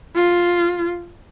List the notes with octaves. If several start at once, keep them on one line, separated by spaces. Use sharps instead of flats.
F4